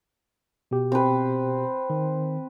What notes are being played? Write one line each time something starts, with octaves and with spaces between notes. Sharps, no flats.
B2 G4
C4 B4
D#3